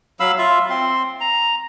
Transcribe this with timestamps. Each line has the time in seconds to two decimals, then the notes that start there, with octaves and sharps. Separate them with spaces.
0.20 F#3 F5 B5 E6
0.38 F4 E5 F5
0.70 C4 C6
1.21 A#5